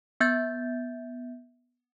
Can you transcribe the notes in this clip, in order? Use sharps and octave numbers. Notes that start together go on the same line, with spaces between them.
B3 E5 G6 A6